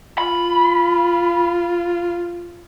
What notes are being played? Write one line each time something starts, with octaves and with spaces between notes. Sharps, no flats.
F4 B5